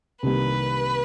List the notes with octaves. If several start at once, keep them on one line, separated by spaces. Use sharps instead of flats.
C2 C3 D#3 G3 A#3 B4